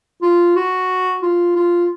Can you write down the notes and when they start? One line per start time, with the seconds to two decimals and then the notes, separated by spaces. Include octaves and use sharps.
0.22 F4
0.56 F#4
1.22 F4
1.56 F4